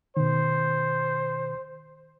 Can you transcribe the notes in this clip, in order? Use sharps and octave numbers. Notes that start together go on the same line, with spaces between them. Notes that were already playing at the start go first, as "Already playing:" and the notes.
B2 D#3 C5